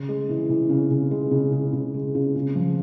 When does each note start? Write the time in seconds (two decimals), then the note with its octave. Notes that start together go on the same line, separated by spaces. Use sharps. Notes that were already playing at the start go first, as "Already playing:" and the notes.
Already playing: C#3
0.09 G#3
0.29 E3
0.49 E3
0.69 C#3
0.91 C#3
1.11 G#3
1.31 C#3
1.52 C#3
1.73 C#3
1.94 G#3
2.15 C#3
2.36 C#3
2.55 F3